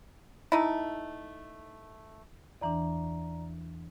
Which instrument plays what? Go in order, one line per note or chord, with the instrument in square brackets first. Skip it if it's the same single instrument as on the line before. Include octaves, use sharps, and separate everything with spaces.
[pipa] A3 D#4 E4
[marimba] E2 E3 D4 [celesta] D5 A#5